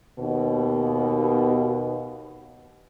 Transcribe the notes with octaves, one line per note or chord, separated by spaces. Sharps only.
D#2 B2